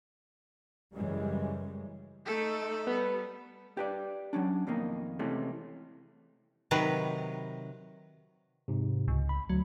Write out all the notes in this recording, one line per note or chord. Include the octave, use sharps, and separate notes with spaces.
F#2 C#3 E3 G3 G#3
A3 D#4 A4
G3 B3
G4 B4 D5
F#3 A#3 C#4 D4
F2 B2 D#3 A#3 D#4
C3 E3 G#3 A3 C#4
C3 D#3 F#3 B4
G#2 C3
C#2
B5
D2 F#3